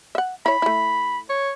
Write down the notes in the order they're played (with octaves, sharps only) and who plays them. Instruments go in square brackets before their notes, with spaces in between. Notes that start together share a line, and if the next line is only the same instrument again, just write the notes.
[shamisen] E5 F#5
[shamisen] E4 C#5 [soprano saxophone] B5
[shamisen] A3 E4
[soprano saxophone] C#5